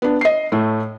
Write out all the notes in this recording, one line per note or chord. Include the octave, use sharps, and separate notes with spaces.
B3 D4
D#5 C7
A2 A3